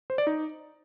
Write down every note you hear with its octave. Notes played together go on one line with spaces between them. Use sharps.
C5
D5
D#4